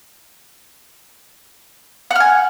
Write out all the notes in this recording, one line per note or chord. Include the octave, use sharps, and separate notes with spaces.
F#5 G#5 F6